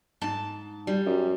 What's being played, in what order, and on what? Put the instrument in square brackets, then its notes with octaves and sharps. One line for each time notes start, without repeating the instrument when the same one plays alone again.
[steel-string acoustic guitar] G#2 A5
G3
[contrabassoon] F#2